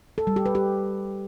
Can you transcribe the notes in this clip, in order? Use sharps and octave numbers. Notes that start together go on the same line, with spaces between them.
A4
G3
G4
B4
G4